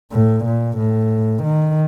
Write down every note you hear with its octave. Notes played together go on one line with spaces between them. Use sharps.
A2
A#2
A2
D#3